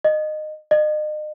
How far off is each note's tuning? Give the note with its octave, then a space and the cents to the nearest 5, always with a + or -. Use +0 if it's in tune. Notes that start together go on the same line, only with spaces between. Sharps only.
D#5 -20
D#5 -40